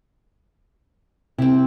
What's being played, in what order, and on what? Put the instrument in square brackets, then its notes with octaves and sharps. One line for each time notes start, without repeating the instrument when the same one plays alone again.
[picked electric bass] C3 [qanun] C4 E4